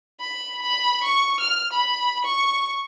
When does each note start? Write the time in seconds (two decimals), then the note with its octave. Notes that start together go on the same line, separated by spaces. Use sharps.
0.20 B5
0.62 B5
1.04 C#6
1.40 F6
1.73 B5
2.25 C#6